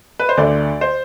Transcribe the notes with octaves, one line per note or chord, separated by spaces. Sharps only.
B4
C5
D2 D3 A3 D5
C5